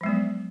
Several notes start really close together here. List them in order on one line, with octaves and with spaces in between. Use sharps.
F3 G#3 B3 F#3